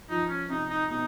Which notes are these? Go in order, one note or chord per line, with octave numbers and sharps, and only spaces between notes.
F3 D#4
C#4
C3 D#4
D#4
B2 D#4